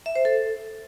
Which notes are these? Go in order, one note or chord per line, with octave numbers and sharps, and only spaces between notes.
E5
C5
A4